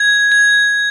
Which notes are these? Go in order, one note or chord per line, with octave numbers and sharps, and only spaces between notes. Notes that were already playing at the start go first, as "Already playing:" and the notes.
Already playing: G#6
G#6